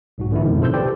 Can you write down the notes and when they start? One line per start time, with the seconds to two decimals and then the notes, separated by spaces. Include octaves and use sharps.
0.18 B1 G#2 F#4
0.31 A#2 D3 E3 G#3 A3 E4
0.45 F2 B2 D3 D#3 F3 G#3
0.61 C3 A4 C5 E6 G6
0.73 G4 A4 B4 C5 D5 G5